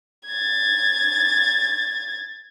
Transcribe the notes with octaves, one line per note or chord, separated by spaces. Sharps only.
G#6 A6